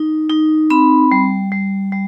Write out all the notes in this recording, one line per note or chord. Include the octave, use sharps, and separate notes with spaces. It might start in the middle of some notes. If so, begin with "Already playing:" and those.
Already playing: D#4
D#4
C4 B5
G3
G3
G3